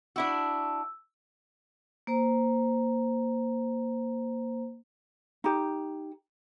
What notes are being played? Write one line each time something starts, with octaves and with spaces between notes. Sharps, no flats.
D4 E4 F#4 E6
A#3 C5 A#5
D#4 G4